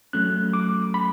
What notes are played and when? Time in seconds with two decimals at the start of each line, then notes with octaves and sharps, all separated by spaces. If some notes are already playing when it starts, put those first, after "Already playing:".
0.13 F#3 A3 C#4 F#6
0.53 D6
0.94 B5